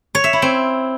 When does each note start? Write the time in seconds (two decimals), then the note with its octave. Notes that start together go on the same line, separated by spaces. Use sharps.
0.15 C#5
0.24 E5
0.33 E4
0.42 C4